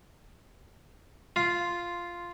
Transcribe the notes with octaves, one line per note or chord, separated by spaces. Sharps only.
F4